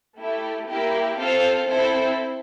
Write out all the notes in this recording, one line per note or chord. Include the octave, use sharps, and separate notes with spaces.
A3 E4 G4
A#3 E4 G4
C4 F4 A4 C5
C4 E4 A4 C5